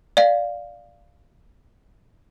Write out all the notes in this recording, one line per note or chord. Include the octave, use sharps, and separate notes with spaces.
D5 F5